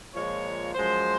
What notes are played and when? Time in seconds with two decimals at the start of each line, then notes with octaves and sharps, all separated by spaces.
0.14 A#2 F3 G#3 C#5
0.74 F#2 F3 G#3 C5